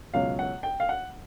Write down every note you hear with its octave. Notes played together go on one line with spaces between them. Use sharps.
C#2 B2 F#3 F5
F#5
G5
F5
F#5